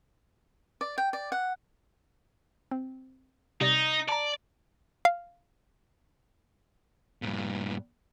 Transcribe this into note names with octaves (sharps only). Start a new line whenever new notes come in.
D5
G5
D5
F#5
C4
C3 G3 D#4 D5
D5 A5 A#5
F5
G2 A#2